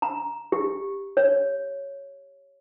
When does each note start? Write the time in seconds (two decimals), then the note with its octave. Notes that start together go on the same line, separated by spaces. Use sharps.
0.02 A#5
0.52 G4
1.17 C#5